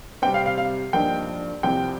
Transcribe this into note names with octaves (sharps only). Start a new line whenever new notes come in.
C3 G3 C4 G5
F5
F5
F5
G2 F3 A#3 D#4 G5
C2 C3 F3 C4 G5